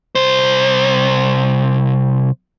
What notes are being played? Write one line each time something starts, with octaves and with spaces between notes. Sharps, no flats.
C2 C5